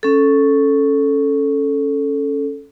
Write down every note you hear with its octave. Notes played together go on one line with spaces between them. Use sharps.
C#4 A4